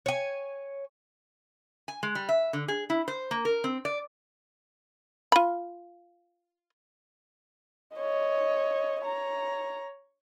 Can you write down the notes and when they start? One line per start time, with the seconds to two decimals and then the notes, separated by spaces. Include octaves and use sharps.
0.06 C#5 G#5
1.88 G#5
2.03 G#3
2.15 G3
2.29 E5
2.53 D3
2.68 G#4
2.90 E4
3.08 C5
3.31 A#3
3.45 A#4
3.64 C4
3.85 D5
5.32 F4 B5
7.96 C#5 D#5
9.02 C#5 A#5